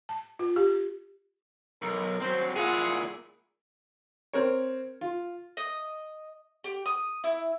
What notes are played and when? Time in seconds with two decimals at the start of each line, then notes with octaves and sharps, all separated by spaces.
0.09 A5
0.39 F4
0.56 G4
1.82 B1 A#4
2.21 F#3 C4 C5
2.56 A#2 E4 F4 G#4 F#5
4.33 C4 A#4 C#5
5.01 F4
5.57 D#5
6.64 G4
6.86 D#6
7.24 E4